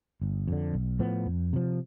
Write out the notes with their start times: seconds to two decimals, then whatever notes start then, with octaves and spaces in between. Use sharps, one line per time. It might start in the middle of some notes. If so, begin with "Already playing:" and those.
0.22 G1
0.48 F2 D3
0.73 B1
0.99 A2 F3 B3
1.26 F2
1.53 C3 F3